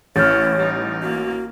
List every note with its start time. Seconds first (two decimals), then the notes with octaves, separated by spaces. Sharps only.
0.16 A1 C#4 E4 C#5 F6 G6 A6
0.54 G3 D#4
1.03 A#3 F#4